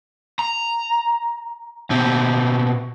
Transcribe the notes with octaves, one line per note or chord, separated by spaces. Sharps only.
A#5
B2 C4